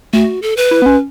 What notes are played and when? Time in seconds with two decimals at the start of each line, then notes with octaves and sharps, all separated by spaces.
0.13 A3 F#4
0.42 A4
0.57 B4
0.71 E4
0.82 B3
0.86 C#4